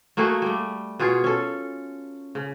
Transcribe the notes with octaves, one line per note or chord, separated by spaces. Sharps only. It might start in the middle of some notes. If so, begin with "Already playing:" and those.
A3 A#3 F#4 G#4
G3 A3
B2 F4 G#4 C#5
C#4 A4
C#3